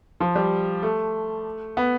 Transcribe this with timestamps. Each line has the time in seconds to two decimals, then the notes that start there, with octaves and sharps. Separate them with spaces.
0.20 F3
0.35 G3
0.82 A3
1.77 B3